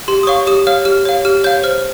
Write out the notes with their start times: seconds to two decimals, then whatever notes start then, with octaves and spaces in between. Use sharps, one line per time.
0.08 G4 C6
0.23 D#6
0.27 C#5 F5 C#6
0.47 G4 D#6
0.67 C#5 F5 F6
0.85 G4 F6
1.05 C#5 F5
1.25 G4 F6
1.44 C#5 F5 G6
1.63 C5 F6